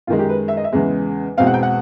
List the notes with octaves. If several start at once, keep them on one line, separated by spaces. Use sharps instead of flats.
F#2 D#3 G#3 F4
G4
B4
E5
D#5
E5
E2 C#3 E3 G#3
E2 B2 G#3 C4 F5
F#5
G5
F#5